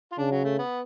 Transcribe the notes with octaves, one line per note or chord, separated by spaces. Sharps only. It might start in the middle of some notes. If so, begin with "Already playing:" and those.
F4
C#3 D4
F#3
A3
B3